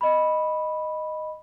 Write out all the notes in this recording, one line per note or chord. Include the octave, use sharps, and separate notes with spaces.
D#5 B5